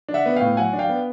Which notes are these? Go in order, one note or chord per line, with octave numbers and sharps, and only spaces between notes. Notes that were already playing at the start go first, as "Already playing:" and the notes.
D4
E5 F#5
B3
A2 F5 G5
F#3 F#5 G#5
D4
F5 G5
B3